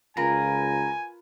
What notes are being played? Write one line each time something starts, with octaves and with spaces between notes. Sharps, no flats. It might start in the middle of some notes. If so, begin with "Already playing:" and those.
C#2 F4 A#4 B4 G#5 A#5